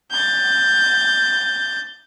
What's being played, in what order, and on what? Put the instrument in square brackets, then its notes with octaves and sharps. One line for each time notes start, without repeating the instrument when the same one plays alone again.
[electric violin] G6 A6